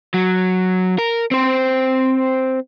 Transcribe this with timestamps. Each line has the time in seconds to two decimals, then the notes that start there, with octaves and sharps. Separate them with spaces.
0.14 F#3
0.99 A#4
1.31 C4 C5